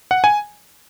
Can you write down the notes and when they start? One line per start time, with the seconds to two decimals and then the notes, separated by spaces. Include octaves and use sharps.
0.11 F#5
0.24 G#5